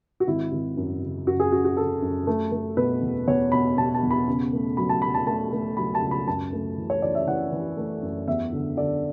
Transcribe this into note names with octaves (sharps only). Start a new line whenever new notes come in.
F#4
G#1 E4
G#1
F#2
C#3
F#2 F#4
G#4
C#3 F#4
F#4
C#3 A4
F#2
A3
A3
B2 B4
E2
E2 C#5
B2 B5
B2 A5
A5
E2
B5
C#3
A3
F#3 B5
A5
F#3 B5
A5
A3 A5
A3
F#3 B5
A5
C#2
B5
F#2 A5
A3
E3
C#5
E3 D5
E5
E3 F#5
E3
A3
F#2
E2 E5
D3
D3 D5